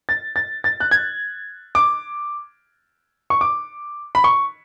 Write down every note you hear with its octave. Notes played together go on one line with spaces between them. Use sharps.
A6
A6
A6
F#6
G#6
D6
C#6
D6
B5
C#6